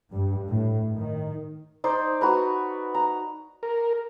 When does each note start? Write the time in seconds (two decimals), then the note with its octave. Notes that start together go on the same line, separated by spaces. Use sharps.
0.11 G2
0.48 A2
0.95 D#3
1.84 D#4 C5 D5
2.21 F#4 B4 A#5
2.94 A#5
3.63 A#4